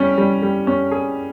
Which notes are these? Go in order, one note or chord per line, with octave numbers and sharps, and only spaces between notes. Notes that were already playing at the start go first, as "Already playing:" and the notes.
Already playing: G3 C#4
G3
G3
C#4
G#4